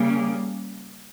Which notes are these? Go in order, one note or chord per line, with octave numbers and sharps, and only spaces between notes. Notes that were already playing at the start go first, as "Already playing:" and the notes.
Already playing: C#3 G3 A#3